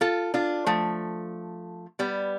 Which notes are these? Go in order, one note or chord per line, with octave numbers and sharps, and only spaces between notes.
F4 A4
D4 F4
F3 A3
G3 B3